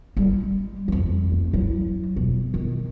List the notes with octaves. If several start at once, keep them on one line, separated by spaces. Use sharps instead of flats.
G3 G#3
F2 E3
A3
F#3 E4
E1
D#3